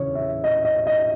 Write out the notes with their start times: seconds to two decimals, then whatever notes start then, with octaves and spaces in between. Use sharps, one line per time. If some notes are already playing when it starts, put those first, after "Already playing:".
Already playing: E2 C#3 E3 C#5
0.15 E5
0.44 D#5
0.65 D#5
0.87 D#5